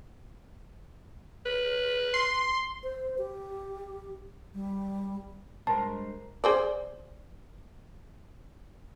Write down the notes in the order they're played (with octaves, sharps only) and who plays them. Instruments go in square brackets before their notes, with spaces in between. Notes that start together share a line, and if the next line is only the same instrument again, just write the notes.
[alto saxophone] B4
[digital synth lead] C6
[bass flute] C5
G4
G3
[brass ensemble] G2 G#3 [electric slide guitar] A#4 C5 [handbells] A5
[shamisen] G#4 C5 D5